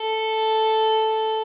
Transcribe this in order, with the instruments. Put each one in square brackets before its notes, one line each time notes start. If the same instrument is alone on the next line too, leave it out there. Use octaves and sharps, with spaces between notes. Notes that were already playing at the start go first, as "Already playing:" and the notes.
Already playing: [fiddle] A4